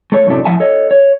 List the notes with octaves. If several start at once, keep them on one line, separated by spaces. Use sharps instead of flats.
A3 A4 C#5
F#2 A2 C3 F#3 A3 D4
A2 F3 E5 F#5 G#5 A5
A4 C#5 D#5
C#5